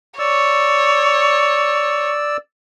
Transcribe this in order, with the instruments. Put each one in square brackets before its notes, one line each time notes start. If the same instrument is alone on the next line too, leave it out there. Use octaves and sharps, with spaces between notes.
[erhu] C#5 [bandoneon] D5 E6